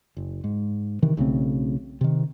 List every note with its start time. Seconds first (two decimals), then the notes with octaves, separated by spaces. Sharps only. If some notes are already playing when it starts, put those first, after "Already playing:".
0.17 F#1
0.44 G#2
1.02 C3 D#3 E3
1.17 B1 C#3 A3 C4
2.01 C3 D#3